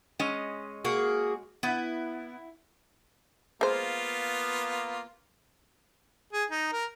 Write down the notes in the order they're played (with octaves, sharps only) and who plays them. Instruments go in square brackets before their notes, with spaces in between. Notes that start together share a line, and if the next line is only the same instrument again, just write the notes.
[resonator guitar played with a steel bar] G#3 C#4 D#5
[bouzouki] A#3 F#4 G#4
[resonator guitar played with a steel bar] B3 [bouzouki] E4
[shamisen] G#3 C5 [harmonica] A#3 B3 F4
[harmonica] G#4
D#4
A#4